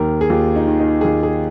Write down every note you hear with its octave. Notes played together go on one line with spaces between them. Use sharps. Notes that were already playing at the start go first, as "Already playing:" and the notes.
Already playing: D#2 D#3 A#4
G#4
D#2 F4
D#4
D#3
D#4
G#4
D#2 F4
G#4